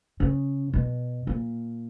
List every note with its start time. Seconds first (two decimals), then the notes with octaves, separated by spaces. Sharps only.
0.20 C#3
0.73 B2
1.27 A#2